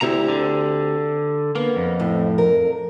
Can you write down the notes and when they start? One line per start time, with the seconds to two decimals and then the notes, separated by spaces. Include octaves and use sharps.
0.01 D2 C4 E4 G4 A#5
0.28 D3
1.55 A#3 B3
1.76 F2
2.00 A2
2.38 A#4